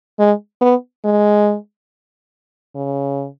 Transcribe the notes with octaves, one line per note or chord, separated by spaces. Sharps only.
G#3
B3
G#3
C#3